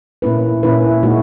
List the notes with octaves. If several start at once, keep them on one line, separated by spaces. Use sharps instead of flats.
A#2 A#3 C#4 E4 B4
A#2 A#3 C#4 E4 B4
A#2 G#3 D#4 F#4